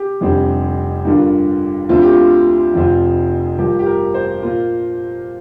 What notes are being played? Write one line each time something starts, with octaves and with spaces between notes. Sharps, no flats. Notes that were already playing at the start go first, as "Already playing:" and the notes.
Already playing: G4
F1 F2 D3 G3 C4
G2 D3 A#3 D4 F4
D2 D3 F3 C4 F4
G4
F4
F1 F2 F3 C4 F4
G2 F3 A#3 G4
G4
A#4
C5
A#2 A#3 F4